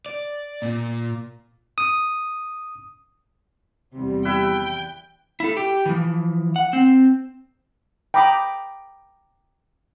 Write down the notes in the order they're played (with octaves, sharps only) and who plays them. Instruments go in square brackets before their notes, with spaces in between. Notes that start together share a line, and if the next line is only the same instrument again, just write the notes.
[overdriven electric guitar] D5
A#2
[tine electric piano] D#6
[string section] E2 G3 [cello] C3
[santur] E4 B4 E5 [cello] G5
[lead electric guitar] E4 A4
G4
E3 F3
F#5
C4
[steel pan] G5 A#5 B5 D6 D#6